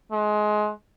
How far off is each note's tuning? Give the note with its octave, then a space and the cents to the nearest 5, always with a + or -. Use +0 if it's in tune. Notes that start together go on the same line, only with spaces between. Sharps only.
G#3 +25